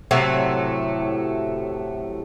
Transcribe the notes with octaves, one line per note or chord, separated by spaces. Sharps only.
A2 C3 F#3 A3